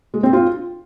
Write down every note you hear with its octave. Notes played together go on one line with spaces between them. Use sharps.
G#3
C4
F4